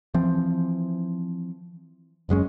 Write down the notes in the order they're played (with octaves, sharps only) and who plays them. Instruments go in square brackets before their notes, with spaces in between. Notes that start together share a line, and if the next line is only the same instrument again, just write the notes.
[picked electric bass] E3 F3 C4
F#1 F#2 G#3 C#4